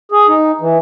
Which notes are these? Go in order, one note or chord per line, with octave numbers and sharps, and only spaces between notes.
G#4
D#4
E3